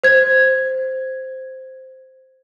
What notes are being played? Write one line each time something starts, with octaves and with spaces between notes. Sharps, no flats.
C5 G#6